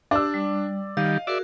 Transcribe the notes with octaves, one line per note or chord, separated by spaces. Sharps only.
D4 G4 D5 E6
G3
D#3 G3 D#5 F5
F#4 G#4 A#4 D5 E5